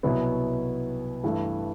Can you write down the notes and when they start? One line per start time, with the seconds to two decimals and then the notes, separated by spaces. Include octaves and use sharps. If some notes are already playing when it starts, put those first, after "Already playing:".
0.03 C2 B2 F#3 B3 E4
1.24 G2 E3 A3